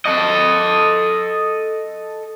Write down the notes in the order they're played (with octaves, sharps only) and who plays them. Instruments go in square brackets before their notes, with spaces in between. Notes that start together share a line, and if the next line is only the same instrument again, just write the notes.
[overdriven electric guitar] A4 D#5